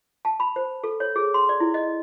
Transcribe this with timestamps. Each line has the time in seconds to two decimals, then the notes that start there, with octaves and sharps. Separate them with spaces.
0.25 A5
0.40 B5
0.56 C5
0.84 A4
1.00 C#5
1.16 G#4
1.34 C6
1.49 D5
1.60 E4
1.74 D#5